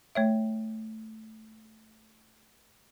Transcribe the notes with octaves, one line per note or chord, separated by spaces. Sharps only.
A3 C#5 E5